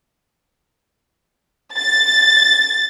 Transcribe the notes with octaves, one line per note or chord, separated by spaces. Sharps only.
A6